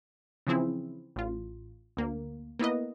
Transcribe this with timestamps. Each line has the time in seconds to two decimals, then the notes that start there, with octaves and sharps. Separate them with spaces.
0.47 C#3 E3 F3 C4 E4 G#4
1.16 A1 F4
1.97 D2 A#3
2.59 A#3 B3 E4 B4 D#5